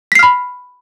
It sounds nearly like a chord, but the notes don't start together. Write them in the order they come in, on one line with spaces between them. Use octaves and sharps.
B6 C7 F6 B5